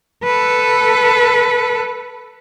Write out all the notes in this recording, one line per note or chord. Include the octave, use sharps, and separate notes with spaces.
A4 B4